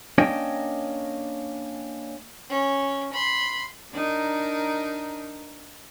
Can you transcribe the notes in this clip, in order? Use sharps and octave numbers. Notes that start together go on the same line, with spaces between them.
A#3 C#4 D4 C#5 D#5 G5
C#4
B5 C6
D4 D#4 A#4